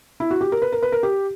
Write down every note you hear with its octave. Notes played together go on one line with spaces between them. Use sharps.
E4
F#4
G4
A#4
B4
A#4
B4
A#4
G4